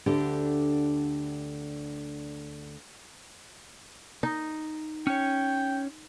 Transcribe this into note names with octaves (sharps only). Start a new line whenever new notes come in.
D2 D3 D4 G4
D#4
C#4 C#5 G5